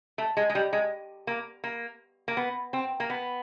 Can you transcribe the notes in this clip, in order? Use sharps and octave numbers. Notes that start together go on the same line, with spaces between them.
A3
G#3
G#3
G3
G#3
A#3
A#3
A#3
B3
C4
A#3
B3